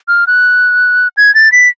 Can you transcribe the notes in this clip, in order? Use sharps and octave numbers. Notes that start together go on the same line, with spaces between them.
F6
F#6
G#6
A6
B6